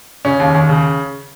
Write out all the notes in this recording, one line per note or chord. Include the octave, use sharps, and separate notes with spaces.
C#3 C#4
D#2
D#2
C#3